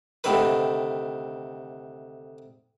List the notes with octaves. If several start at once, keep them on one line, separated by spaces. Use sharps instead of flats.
D2 C3 D#3 B4